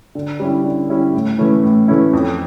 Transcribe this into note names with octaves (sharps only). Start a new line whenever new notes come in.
D3
G3 C#4 E4
D3
G3 C#4 E4
A2
E3 A3 C#4 E4
A2
E3 A3 C#4 E4
F2